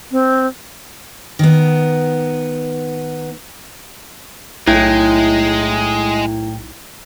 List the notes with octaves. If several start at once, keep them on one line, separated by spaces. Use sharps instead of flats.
C4
D#3 B3
B1 A2 G#3 E4 G5 G#6